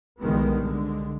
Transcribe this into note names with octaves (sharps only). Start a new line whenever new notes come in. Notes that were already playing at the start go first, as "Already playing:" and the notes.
B1 D3 D#3 G3 G#3 B3
C2 D3 G#3